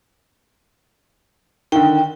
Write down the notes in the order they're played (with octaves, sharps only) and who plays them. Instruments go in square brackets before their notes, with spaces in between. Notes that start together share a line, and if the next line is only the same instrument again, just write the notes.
[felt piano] D3 D#3 [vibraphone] G5